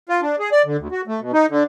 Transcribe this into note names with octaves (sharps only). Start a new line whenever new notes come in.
F4
D4
G#4
D5
D3
D2
F#4
A3
B2
D#4
D3